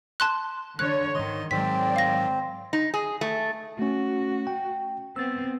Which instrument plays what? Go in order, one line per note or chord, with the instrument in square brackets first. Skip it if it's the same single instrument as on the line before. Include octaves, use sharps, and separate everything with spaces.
[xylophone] A5 C6 F#6
[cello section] D3 C#5 [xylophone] F#6
[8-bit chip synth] G#2 C6 [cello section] D#3 [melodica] D#5
[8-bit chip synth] G#2 D#3 F#3 [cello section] G#3 D5 [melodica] C4 [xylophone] B6
[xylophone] F5 A#6
[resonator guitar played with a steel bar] D#4
G#4
A3
[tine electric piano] A3 C#4 [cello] F#4
[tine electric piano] G5
[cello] B3 C4 [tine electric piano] E6 A6